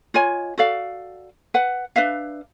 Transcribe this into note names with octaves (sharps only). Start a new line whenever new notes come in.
F4 C#5 D#5 G#5
F#4 A4 D5 F5
B4 F#5
D4 B4 E5 F5